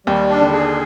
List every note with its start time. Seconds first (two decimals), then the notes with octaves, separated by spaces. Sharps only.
0.07 D#2 D#3 G3
0.30 D4
0.41 D3
0.52 G#4